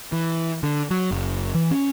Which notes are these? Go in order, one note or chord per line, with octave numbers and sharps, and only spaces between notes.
E3
D3
F#3
F#1
E3
C#4